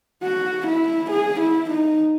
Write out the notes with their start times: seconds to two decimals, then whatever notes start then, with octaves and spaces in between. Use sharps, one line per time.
0.23 F#4
0.67 E4
1.11 G#4
1.40 E4
1.71 D#4